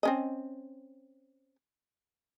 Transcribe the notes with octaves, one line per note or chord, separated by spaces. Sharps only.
C4 C#4 D#5